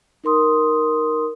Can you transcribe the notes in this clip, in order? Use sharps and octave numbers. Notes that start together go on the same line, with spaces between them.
D#4 A#4 C6 D#6